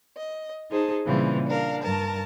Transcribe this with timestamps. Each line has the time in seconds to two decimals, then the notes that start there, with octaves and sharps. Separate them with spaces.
0.17 D#5
0.71 D#4 G#4 C5 A5
1.05 A#2 C#3 E3 G3 C4
1.47 D4 A#4 F5
1.82 G2 A#4 A5